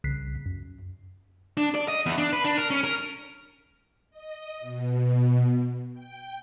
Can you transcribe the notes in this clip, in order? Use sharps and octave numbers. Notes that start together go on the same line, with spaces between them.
C2 C#3 F#6 B6 C7
F#2
D4
D5
D#5
E2
D4
B4
D4
A#4
C#4
A#4
D#5
B2
G5